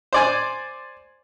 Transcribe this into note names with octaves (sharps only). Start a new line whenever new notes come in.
C5 D5 G#5